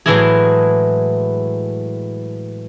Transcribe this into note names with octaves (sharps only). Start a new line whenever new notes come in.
A2 E3 F#3 G#3 E4 G#4